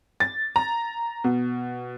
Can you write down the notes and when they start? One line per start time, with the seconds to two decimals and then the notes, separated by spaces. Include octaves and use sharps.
0.20 A6
0.56 A#5
1.24 B2